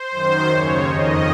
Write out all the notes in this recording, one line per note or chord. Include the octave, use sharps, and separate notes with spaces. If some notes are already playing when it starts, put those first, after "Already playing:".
Already playing: C5
F#2 D#3
D#2 C#3 C#5
F2 D#3 D#5